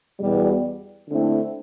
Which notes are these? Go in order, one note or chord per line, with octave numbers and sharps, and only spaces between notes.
E2 B2 G3
D3 A3 C4 E4